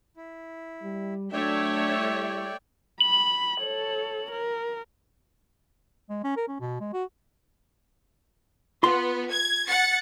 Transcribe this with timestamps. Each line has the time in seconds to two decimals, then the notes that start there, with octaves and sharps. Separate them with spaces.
0.17 E4
0.83 G3
1.32 F#3 A3 D4 C#5 D5 E5 G5
1.98 G3 E4
3.01 B5 F#7
3.61 A4 C#5
4.32 A#4
6.10 G#3
6.24 C#4
6.37 A#4
6.48 C#4
6.60 B2
6.80 G#3
6.93 F#4
8.83 B3 F4 C6
9.30 G#6
9.67 F#5 A6 C#7